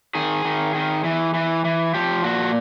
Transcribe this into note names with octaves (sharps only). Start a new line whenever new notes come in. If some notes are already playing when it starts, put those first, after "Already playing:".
D#3 G#4
D#3
D#3
E3
E3
E3
F3 G4
A#2 F#4